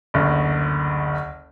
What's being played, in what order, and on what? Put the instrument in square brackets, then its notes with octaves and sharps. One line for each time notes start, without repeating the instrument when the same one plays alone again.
[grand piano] F#1 D2